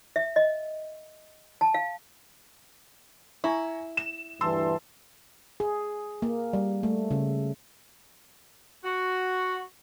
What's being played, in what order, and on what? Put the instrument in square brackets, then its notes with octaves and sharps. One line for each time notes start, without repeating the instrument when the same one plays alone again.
[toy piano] E5
D#5
A5
F5
[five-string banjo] E4 [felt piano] G#5 A#5 C#6
[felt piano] E7
[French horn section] D2 G2 E3 [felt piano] A5 C6 E6
[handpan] G#4
A#3
G3
A3
C#3
[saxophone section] F#4